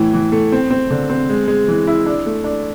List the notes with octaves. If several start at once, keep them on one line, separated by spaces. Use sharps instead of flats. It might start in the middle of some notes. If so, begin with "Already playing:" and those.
Already playing: A2 E3
E3
A3
C4
C4
D3
C4
G#3
G#3
E3
E4
D4
A3
D4